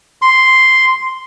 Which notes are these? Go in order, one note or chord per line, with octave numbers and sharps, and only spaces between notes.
C6